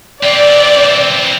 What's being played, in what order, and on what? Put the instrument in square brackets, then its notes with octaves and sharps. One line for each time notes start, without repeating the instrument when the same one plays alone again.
[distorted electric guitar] E3 C4 [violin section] D5